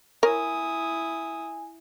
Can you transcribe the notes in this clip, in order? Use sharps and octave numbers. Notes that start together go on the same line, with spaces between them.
E4 A#4 C#5 G#5 D#6